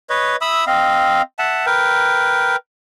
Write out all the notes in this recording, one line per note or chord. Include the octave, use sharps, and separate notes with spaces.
B4 C#5 D#5
E5 B5 D#6 E6
C4 D#5 F5
E5 F#5 A5
A#4 B4 G5